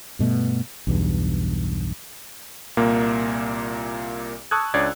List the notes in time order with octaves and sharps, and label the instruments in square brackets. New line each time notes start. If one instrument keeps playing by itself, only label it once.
[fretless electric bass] G2 B2 A3
B1 E2 G2
[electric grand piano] C2 A#2 A#3
A5 C#6 D#6 E6 F#6 G#6
C#2 D4 C#5 D5 G#6